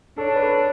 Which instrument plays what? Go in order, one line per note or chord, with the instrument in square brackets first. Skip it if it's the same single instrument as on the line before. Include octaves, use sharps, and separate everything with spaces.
[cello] D4 [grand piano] A4 C#5
[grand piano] B4
A4 C#5